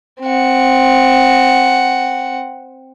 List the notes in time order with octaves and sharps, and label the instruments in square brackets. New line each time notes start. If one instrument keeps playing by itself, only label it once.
[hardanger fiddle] C4 F#5